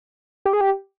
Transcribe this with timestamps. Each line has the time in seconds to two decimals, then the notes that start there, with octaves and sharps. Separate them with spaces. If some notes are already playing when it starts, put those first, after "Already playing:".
0.45 G4
0.53 G#4
0.61 G4